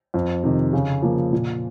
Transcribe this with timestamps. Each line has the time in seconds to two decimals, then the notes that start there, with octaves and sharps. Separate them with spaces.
0.14 F2
0.43 C3 D#3
0.73 C#3
1.02 F3 A#3
1.33 A#2